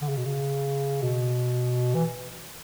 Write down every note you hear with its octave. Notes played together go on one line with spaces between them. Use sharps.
D3
C#3
B2
C#3
B2
E3